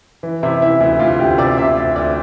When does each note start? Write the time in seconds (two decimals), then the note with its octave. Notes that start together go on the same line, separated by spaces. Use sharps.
0.23 E3
0.43 C3 E4
0.61 E3 E4
0.80 D2 E4
0.99 D2 F4
1.19 D2 G4
1.38 C3 D5
1.57 C3 E5
1.76 D2 D5
1.96 D2 D5